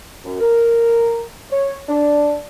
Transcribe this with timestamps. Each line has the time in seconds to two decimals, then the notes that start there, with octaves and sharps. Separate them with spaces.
0.25 F#2
0.41 A#4
1.51 C#5
1.89 D4